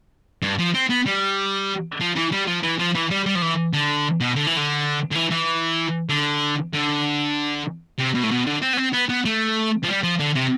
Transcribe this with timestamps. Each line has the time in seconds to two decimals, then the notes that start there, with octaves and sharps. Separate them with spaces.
0.42 G2
0.59 F3
0.74 C4
0.89 B3
1.06 G3
2.00 F3
2.16 E3
2.32 G3
2.47 F3
2.63 E3
2.79 F3
2.95 E3
3.10 G3
3.26 G3
3.35 F3
3.42 E3
3.73 D3
4.20 B2
4.36 D3
4.47 E3
4.57 D3
5.11 D3
5.15 E3
5.31 E3
6.09 D3
6.73 D3
7.98 C3
8.14 B2
8.23 A2
8.31 B2
8.46 D3
8.62 C4
8.73 B3
8.77 C4
8.93 B3
9.09 B3
9.25 A3
9.83 F3
9.88 G3
10.03 F3
10.19 D3
10.35 C3